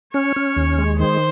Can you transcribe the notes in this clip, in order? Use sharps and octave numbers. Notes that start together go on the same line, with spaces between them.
C#4 C#5
C#4
D#2
G#3
D#3 C5